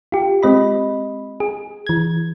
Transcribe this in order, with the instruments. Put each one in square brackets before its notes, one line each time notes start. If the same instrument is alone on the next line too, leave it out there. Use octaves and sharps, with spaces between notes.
[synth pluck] F4 G4
G#3 C4 D#5 B5
G#4
E3 G#6